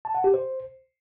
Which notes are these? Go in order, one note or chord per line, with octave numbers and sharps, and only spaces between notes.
A5
F#5
G4
C5